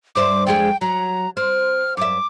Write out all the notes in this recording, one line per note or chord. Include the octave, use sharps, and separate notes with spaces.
G2 C5 E5 D6
F2 G#3 G#4 G5
F#3 A#5
C4 F6
F#2 E5 D6